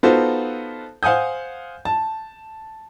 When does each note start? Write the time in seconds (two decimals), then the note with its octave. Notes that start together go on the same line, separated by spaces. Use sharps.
0.03 B3 D#4 F4 F#4 A4 C5
1.03 C5 F5 F#5 G#5 D#6 G6
1.85 A5